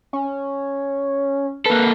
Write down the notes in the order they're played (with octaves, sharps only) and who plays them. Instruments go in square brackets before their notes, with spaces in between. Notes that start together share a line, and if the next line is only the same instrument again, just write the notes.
[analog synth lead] C#4
[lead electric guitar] A#3 A4 [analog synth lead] B4